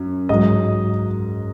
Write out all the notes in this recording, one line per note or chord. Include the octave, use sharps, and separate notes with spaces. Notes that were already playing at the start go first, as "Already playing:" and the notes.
Already playing: F#2
G#2 F#3 D#5